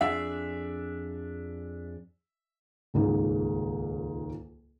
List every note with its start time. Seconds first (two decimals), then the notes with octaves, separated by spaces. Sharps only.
0.01 F2 D4 G#4 E5
2.94 D#1 C#2 G#2 G#4